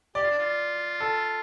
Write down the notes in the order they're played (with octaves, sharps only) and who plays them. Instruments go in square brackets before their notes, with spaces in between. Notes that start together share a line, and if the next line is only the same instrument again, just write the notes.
[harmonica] G4 [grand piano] D5
[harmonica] F4
D4
F4
[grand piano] A4